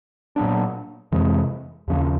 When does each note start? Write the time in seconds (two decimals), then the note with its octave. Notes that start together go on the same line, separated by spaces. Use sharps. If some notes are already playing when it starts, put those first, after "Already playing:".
0.36 A#2 F#3 B3 D4
1.12 F2 C3 E3 G#3
1.88 D#2 C#3 F3